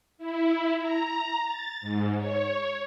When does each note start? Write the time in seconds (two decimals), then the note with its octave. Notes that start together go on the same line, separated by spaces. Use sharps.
0.18 E4
0.79 A#5
1.43 A6
1.81 G#2
2.17 C#5